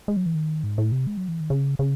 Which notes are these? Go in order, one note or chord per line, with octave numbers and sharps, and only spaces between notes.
G#3
F#3
E3
D#3
G#2
A2
C3
G#3
F#3
E3
D#3
C#3
C#3